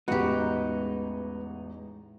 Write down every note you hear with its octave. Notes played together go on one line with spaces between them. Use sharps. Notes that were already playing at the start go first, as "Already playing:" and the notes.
A1 E2 G#3 D#4 F#4 G4 B4 F#5